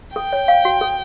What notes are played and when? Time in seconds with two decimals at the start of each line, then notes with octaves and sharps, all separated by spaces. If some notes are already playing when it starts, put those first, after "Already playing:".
0.15 A4 G5
0.33 C#5
0.48 F5
0.65 F#4
0.81 A4